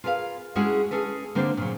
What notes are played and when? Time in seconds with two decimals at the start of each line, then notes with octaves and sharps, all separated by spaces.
0.04 F4 G#4 A#4 B4 F5
0.55 G#3 C#4 E4 F#4 G#4 A4
0.91 C#4 G#4 A4 B4
1.35 D3 A#3 C4 D4 C5
1.57 A#2 C#3 F#3